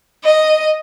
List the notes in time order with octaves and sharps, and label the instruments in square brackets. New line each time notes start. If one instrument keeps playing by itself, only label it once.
[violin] D#5